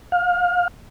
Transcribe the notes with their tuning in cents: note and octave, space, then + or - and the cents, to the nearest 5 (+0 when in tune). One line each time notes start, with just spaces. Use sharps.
F5 +30